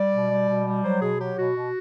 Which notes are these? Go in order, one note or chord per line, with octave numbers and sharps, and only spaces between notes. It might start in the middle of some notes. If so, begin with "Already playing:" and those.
Already playing: G3 D5
B2
G3
B2
G3
F#3 C5
B2 G#4
F#3 G4
B2 F#4
B2